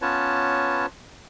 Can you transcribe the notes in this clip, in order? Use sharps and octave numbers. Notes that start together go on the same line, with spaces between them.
B3 C#4 F4 B4 C#5 A5